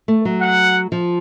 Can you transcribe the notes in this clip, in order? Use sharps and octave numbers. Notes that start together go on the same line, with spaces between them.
A3
F#3
F#5
F3